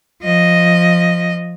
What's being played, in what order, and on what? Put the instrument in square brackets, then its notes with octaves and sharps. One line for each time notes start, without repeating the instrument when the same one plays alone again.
[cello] F3 D#5